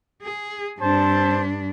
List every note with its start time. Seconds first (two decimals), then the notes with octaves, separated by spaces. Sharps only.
0.22 G#4
0.80 G2 C4 D4 C5 A5